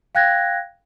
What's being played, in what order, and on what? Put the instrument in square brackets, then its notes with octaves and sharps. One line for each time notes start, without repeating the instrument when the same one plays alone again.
[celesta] F5 G5 F#6 G#6 A#6